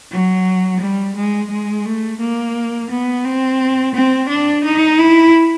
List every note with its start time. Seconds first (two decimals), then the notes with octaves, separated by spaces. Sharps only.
0.11 F#3
0.80 G3
1.16 G#3
1.50 G#3
1.85 A3
2.20 A#3
2.90 B3
3.25 C4
3.94 C4
4.29 D4
4.64 D#4
4.98 E4